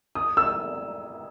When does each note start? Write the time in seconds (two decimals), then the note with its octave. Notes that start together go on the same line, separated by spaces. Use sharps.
0.15 D#6
0.37 E6